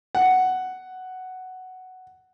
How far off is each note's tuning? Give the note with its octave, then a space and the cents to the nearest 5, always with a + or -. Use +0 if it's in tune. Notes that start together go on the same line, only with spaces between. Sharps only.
F#5 +5